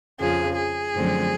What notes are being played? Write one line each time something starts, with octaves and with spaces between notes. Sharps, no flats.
F2 C#3 F3 G#4
G#4
F#2 D3 F3 A3 C4